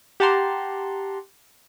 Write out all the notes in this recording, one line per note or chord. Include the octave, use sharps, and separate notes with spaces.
G4 F#5 A5 A#5 C6